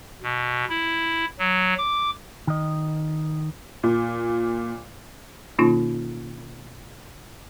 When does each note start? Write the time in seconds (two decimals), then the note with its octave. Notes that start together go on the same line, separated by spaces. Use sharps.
0.22 B2
0.69 E4
1.39 F#3
1.78 D6
2.47 D#3 D#5
3.83 A#2
5.59 B2 D#3 A#3 C#4 D#4 F4